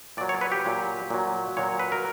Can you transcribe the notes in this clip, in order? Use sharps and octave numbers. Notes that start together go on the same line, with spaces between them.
A#2 F#3 D5
C#5
B4
G4
A#2 F#3
A#2 F#3
A#2 F#3 C#5
B4
A#4